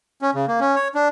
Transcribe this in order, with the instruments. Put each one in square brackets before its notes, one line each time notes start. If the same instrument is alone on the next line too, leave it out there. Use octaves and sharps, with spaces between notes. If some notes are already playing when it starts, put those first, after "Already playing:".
[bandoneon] C#4
C#3
A#3
C#4
C#5
D4